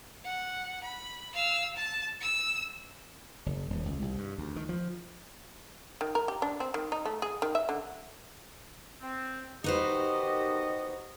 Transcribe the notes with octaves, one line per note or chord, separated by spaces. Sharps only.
F#5
B5
F5 E6
A5
E6
F#1
D#1
C#2
C2
G2
D2
D#3
F3
D#3
A#4
G4
D4
C4
D#3
D#4
A3
G#4
D#3
E5
D3
C4
D#3 B3 D#4 F#4 G4 B4 C5 D#5